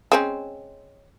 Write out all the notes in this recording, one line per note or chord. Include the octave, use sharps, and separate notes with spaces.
G#3 C4 C#4